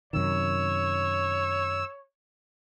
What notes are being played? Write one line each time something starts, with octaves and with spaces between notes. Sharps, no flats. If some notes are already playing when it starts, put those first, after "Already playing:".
F#2 C3 D#3 C#5 E6